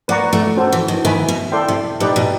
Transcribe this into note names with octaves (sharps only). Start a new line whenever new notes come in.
A#3 B4 D5 F#5 A#5 C#6
A3
C#4 F#4 A4 C5
E3
D#3
D#3 B4 E5 G#5 B5
B2
E4 A4 D5 G5 C6
C3
A#2 D#4 G4 B4 D5
B2